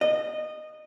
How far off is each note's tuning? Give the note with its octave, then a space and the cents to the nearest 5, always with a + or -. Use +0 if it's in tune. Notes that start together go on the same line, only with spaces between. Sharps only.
D#5 -15